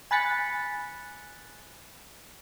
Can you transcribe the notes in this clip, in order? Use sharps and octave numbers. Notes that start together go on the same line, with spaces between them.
G#5 B5 F#6 A6 B6 C#7